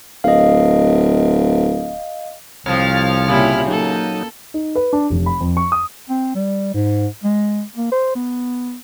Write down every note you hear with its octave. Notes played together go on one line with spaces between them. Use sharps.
D1 D#5 F5
C2 F2 F3 C#5 F6
A#2 C#3 E4 G4
F#3 A#3 D#4 A4
D#4
B4
D4
F1
B5
F2
C#6
D#6
C4
G3
G#2
G#3
A#3
C5
B3